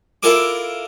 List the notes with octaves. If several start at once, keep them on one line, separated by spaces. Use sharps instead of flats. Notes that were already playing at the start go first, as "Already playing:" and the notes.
E4 F4 A4 A#4 G#5 D6